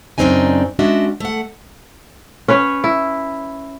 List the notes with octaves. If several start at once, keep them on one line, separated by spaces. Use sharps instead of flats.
F#2 C#3 C4 D4 D#4 G#5
G#3 C#4 D4 F#4 D#5 E5
A3 F#5
C#4 B4 C#5
E4